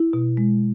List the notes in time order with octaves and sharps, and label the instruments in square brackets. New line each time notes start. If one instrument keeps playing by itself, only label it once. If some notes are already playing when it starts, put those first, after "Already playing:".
Already playing: [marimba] E4
B2
G#3